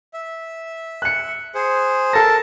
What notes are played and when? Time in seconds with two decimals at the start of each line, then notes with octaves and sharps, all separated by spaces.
0.13 E5
1.02 F#6 C#7
1.55 G#4 C5
2.13 A4 A#4 A5 A#6